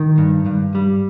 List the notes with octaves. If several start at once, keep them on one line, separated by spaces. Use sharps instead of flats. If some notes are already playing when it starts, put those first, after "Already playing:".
Already playing: D#3
G2
G2
G3